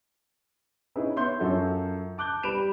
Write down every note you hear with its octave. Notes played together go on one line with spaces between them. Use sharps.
C#4 D#4 E4 G#4 B4
B3 C#5 E5 C6 G6
F#2 F4 F#4 A4 C#5
A5 D6 F#6 G6 G7
G3 B4 B5 D7 E7 F7